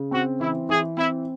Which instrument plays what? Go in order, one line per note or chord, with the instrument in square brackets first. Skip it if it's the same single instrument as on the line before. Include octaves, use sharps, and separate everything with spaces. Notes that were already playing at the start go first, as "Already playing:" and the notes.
Already playing: [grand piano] C#3
[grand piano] C4 [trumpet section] F#4
[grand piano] E3 [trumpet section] E4
[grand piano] E3 [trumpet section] G#4
[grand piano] C4 [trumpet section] E4